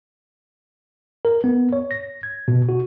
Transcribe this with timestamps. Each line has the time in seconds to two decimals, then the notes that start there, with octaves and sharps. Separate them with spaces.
1.25 A#4
1.44 B3
1.73 C#5
1.91 A#6
2.23 G#6
2.48 B2
2.69 F#4